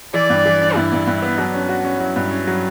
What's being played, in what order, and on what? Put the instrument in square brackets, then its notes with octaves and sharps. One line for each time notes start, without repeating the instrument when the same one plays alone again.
[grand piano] E3 [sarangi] D5
[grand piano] G2
E3
D4
[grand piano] G2 [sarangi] E4
[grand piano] G2
G2
B3
[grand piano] F#3 [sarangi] D4
[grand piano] C#4
F#4
C#4
[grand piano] F#3 [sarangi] E4
[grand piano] G2
C#4
F#3